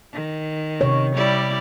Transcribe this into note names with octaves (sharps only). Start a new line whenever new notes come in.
D#3
C3 C#5
G3 E4 D5